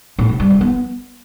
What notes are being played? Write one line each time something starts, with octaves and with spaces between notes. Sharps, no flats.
A2
C3
G3
F3
B3